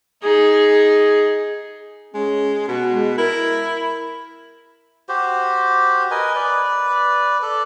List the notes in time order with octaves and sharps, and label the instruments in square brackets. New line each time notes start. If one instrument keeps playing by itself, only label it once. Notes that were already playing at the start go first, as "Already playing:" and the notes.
[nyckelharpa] D#4 G#4
[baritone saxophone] G#3 [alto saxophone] C#4
[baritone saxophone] B2 [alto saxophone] F#4
[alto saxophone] G#3
[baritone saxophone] E4 [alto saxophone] A#4
[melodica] F#4 G4 C5
A#4 B4 D#5 G#5
B4 D5
A4 D5